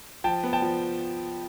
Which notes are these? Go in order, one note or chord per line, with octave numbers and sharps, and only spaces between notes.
F3 G5 A5
B3
G5 A5
F3